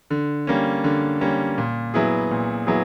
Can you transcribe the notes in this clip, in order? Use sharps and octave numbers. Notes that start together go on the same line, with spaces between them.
D3
G3 A#3 C#4
D3
G3 A#3 C#4
A#2
F#3 B3 E4 G#4
A#2
F#3 B3 E4 G#4